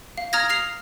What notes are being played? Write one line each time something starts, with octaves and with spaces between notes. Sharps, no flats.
F5
A#5 D#6 F6 G#6 A#6
F6 C7 F7